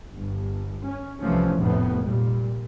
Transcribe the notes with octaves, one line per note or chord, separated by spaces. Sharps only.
G1
C#4
C2 E3 F3 A3 C#4
F1 F2 A2 B3
A#2 G3